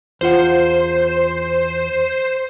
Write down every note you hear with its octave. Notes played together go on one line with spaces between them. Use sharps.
E2 F4 C5 F#5